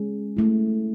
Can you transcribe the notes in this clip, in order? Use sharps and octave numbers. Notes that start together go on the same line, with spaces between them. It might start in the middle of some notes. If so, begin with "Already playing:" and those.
Already playing: G#3 C#4 G#4
A3 E4